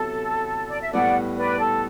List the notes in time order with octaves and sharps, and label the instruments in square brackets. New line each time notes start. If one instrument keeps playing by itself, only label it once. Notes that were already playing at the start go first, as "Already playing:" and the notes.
Already playing: [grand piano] C3 F#3 B3 E4 G4 [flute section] A4
[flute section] D5
E5
[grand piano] A2 G3 B3 [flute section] D5 F#5
[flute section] B4 D5
A4